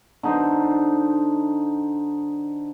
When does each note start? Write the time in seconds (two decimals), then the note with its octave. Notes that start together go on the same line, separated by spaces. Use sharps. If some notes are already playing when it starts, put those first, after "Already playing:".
0.23 D3 D#4 C5